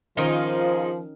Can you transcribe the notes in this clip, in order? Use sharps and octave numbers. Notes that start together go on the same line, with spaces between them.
D#3 F3 C#4 D#4 F4 G#4 C5 D#5